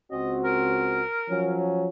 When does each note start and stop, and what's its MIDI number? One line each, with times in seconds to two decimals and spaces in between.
0.11 1.02 37
0.11 1.02 60
0.11 1.02 66
0.11 0.35 75
0.45 1.70 70
1.29 1.89 53
1.29 1.89 54
1.29 1.89 61